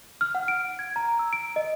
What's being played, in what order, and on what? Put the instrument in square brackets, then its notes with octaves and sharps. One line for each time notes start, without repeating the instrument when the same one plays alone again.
[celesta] F6
F#5
D7
G#6
A#5
E6
D7
D#5